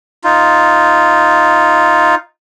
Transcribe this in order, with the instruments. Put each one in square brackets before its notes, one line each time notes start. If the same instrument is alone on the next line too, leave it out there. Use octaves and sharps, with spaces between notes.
[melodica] D#4 F4